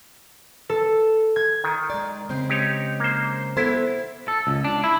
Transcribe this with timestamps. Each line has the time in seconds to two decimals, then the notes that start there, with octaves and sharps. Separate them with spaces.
0.69 A4
1.36 G#6
1.64 D#3
1.90 G#3 D5
2.29 C#3 G#3 C4 C5
2.49 D#4 G4 C#5
3.00 A#3 C5
3.57 B3 E4 A4 C5
4.28 A4
4.47 C#2
4.64 D4
4.84 E4